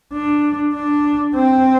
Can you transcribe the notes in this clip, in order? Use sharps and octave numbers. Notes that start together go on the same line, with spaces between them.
D4
D4
C4